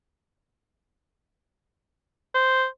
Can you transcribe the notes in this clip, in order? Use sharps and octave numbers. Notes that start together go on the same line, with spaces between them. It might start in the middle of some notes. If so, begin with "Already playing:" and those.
C5